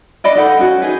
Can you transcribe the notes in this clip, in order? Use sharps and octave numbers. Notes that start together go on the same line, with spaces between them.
D4 D5 D#5 B5
D#4 A4 F#5
C#4 F#4
D#4 G#4 B4